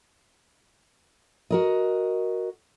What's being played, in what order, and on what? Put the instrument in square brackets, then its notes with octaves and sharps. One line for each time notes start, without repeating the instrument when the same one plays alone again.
[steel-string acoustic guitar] F#4 A#4 D#5